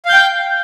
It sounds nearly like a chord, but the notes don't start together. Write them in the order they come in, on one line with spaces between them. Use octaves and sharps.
F5 G6 G5